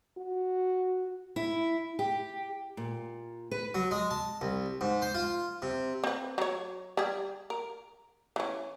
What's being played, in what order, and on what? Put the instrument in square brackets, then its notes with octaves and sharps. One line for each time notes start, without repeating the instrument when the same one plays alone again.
[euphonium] F#4
[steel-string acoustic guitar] E4
G4
A#2
B4
[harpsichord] F#3
G#3
A5
C2
G#2
C5
F4
C3
[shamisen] C4 B4
F#3 C#5
G3 G#4
A#4
E3 C#4